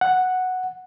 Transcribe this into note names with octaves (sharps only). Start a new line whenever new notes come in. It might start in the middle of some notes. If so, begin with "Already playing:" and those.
F#5